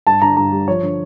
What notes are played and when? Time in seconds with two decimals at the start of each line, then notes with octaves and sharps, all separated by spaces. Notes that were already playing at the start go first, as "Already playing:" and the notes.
0.07 G2 A5
0.22 D3 A#5
0.37 G2 A#5
0.52 G3
0.68 F3 C#5
0.83 D3